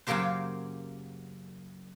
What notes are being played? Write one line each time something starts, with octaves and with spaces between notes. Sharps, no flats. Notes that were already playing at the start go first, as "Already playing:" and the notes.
F#2 C#3 F#3 A#3 G4 C5